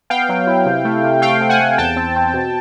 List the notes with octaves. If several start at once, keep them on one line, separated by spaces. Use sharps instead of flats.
B3 F5 G5
F#3
E4
C3
A3
C3
A3 F5 G5
C4
F#5 G#5
A3
E2 G5 A5
C4
C4
B2